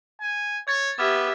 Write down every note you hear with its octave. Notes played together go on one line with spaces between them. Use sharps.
G#5
C#5 G#6 A6
B3 G4 E5 D6 F6 G#6